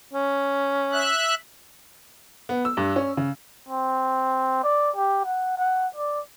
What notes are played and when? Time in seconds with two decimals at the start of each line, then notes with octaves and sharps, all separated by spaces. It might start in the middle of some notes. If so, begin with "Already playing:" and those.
0.13 C#4
0.92 E5 F#6
2.49 B3
2.65 E6
2.77 G2
2.96 C#4
3.17 C#3
3.69 C4
4.63 D5
4.96 G4
5.26 F#5
5.58 F#5
5.96 D5